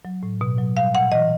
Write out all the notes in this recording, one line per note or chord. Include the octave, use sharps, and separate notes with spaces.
F#3
A2
B2
F#3
G3 F5
A#2 F#5
E3 D#5